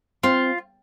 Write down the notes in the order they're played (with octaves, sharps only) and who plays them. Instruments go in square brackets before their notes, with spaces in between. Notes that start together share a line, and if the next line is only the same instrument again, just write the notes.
[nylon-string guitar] C4 [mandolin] F4